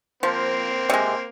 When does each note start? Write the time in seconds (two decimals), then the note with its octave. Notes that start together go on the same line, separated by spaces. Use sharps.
0.23 F3 A#3 C4
0.90 C3 G#3